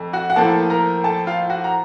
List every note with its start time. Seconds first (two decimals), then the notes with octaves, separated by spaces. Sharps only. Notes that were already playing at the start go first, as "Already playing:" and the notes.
Already playing: F2 A3
0.13 F#4 F#5
0.30 F#5
0.36 A2 F3 A#3 A4 A5
0.70 A#4 A#5
1.04 A4 A5
1.27 F4 F5
1.50 F#4 F#5
1.64 A#5